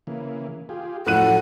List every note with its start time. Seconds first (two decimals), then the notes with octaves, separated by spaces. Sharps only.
0.07 C#3 E3 A#3
0.69 F4 G4 G#4
1.07 A2 F3 F#3 C#4 A4 F#5 F#6 D#7